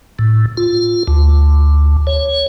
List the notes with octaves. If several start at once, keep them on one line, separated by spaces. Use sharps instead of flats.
A2
F4
D2
C#5